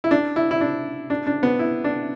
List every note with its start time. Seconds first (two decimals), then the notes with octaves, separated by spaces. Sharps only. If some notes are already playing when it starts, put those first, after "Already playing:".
0.04 E4
0.11 D4
0.36 E4
0.51 E4
0.61 D4
1.10 D4
1.27 D4
1.43 B3
1.59 E4
1.84 D4